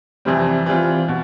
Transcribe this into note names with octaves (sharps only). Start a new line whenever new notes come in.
F2 C3 E3 G3 C4
E3 G3 C4 F4
B2